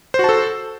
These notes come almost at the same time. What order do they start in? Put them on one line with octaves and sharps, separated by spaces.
C5 F#4 A5 A4